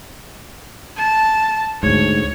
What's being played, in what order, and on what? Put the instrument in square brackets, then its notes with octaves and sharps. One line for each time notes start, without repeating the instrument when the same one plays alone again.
[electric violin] A5
[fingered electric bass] D2 G#2 [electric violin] C#5